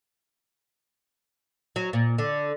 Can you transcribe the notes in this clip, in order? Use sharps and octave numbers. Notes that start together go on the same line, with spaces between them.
F#3
A#2
D3